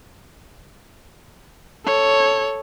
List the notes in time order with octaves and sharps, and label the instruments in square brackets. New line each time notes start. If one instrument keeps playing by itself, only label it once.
[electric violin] A4 C#5